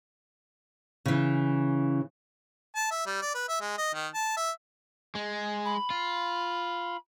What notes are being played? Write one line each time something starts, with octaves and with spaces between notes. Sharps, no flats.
C#3 E3
A5
E5
G3
D5
B4
E5
G#3
D#5
D#3
A5
E5
G#3
B5
F4